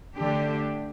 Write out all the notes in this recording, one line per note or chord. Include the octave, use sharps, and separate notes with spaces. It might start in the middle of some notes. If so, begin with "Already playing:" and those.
D3 A3 D4 G4